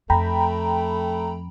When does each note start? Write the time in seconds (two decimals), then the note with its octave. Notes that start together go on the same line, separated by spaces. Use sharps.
0.10 F2 A3 G5 A#5 B5